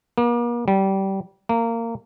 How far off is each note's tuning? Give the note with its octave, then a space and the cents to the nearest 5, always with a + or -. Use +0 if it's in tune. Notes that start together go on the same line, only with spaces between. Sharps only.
A#3 +40
G3 -20
A#3 -20